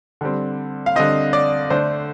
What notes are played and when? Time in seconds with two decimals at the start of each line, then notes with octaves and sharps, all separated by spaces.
0.21 D3 G3 C4
0.86 F5
0.96 D3 G3 C4 D#5
1.33 D5
1.70 D3 A3 D4 C5